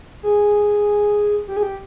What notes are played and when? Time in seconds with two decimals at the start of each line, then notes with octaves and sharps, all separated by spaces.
0.23 G#4
1.48 G4
1.57 G#4
1.63 G4